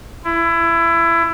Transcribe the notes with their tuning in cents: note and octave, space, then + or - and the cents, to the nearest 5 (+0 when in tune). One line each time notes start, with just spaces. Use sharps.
E4 +25